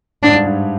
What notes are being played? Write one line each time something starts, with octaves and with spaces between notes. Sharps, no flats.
G#2 D4
G2
G2